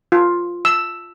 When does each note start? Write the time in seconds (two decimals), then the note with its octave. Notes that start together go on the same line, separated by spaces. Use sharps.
0.12 F4
0.65 E6